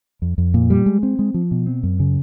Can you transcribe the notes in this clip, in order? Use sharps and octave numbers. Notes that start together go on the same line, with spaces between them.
F2
F2
A#2
G3
G#3
C4
G#3
F3
B2
C4
F#2
C#3